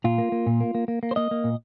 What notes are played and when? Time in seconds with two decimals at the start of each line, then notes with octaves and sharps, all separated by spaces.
0.04 A#2 F4
0.18 A#3
0.32 A#3
0.47 A#2
0.61 A#3
0.75 A#3
0.88 A#3
1.03 A#3
1.11 C5
1.16 A#3 D#5
1.31 A#3
1.44 A#2